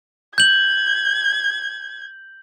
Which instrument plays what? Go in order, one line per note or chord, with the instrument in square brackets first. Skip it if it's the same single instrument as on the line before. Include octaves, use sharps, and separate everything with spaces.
[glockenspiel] G6 F#7 [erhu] G#6